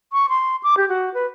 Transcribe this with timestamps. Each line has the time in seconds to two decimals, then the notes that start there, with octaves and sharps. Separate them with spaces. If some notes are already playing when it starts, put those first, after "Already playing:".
0.13 C#6
0.29 C6
0.63 D6
0.77 G4
0.89 F#4
1.14 B4